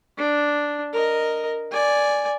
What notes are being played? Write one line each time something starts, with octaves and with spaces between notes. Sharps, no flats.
D4
A#4 D#5
D5 G#5